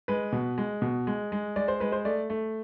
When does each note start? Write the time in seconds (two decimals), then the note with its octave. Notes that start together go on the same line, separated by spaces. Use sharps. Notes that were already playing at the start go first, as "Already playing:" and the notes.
0.08 G#3 B4
0.32 B2
0.58 G#3
0.82 B2
1.07 G#3
1.32 G#3
1.56 G#3 D5
1.68 C5
1.80 G#3 B4
1.92 C5
2.05 A3 D5
2.30 A3